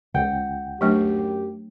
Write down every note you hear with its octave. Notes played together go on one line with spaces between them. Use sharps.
C#2 F#5 G5
F#2 F#3 A3 D4 G4